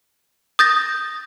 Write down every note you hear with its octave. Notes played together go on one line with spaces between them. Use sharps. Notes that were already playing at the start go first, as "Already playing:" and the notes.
D#6 G6 A6 A#6